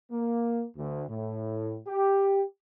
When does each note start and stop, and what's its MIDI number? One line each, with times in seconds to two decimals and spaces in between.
0.12 0.64 58
0.77 1.04 38
1.09 1.77 45
1.88 2.43 67